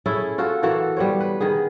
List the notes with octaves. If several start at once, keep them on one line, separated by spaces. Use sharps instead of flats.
C#4 E4 G#4 A4
F4 F#4 A4
E3 A#3 F#4 A4
G3 B3 C5 C#5
B4
D#3 B3 G#4